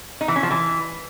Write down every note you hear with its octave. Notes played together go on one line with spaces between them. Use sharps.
D#4
E3
C#4
F3
E3